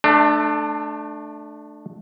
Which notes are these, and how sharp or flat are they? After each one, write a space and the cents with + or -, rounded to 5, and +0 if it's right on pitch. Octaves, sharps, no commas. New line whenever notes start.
A3 -10 D4 +25